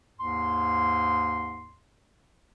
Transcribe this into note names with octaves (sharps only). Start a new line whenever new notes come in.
D#2 G#2 C6